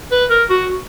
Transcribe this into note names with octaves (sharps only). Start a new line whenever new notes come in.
B4
A#4
F#4